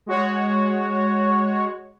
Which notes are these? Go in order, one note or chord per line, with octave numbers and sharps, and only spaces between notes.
G#3 F#4 C#5